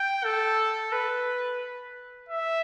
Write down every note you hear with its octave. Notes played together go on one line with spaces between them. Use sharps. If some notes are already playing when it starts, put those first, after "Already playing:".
Already playing: G5
A4
B4
E5